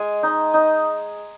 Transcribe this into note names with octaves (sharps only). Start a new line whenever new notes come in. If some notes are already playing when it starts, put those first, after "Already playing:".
Already playing: G#3 G#5
D#4
D#4